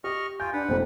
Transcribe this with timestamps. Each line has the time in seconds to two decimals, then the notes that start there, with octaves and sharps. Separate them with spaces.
0.04 G4 D#5 C#6 F6
0.40 F4 G5 G#5 G6
0.53 D4 B4 F#5
0.69 F1 F2 C5